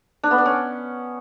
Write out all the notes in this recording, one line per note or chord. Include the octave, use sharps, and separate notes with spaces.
D4
B3
D5
C#4